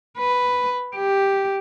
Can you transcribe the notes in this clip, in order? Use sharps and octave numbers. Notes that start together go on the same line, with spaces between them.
B4
G4